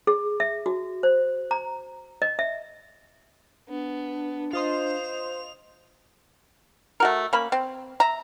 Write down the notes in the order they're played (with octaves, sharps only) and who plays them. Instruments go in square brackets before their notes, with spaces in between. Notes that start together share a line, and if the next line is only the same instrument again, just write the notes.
[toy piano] G#4
E5
F#4
C5
A#5
D#5
E5
[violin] B3 [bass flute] D4
[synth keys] F4 D#5 C6 [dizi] C5 [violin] F7
[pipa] A3 F#4 A#4
A#3 C#4 B5
C4
E5 A#5